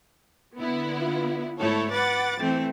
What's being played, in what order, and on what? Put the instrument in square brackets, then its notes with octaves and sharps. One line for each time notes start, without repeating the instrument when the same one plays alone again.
[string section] D3 B3 E4
[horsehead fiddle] F4
[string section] G#2 A4 C#5 [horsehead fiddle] A3 E4
[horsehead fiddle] B4 F#5 [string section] D6 A6
[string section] E3 [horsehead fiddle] A3 C4